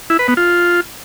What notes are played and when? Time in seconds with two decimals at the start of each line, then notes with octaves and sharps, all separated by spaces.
0.10 E4
0.19 B4
0.28 B3
0.37 F4